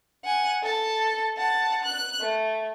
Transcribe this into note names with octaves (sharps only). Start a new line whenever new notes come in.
F#5 G#5
A4 A5
F#5 A5
F#6
A3